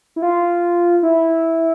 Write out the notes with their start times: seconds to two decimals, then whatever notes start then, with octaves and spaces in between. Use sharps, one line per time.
0.16 E4
0.22 F4
1.03 E4